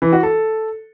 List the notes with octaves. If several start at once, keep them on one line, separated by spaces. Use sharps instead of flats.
E3
F#4
A4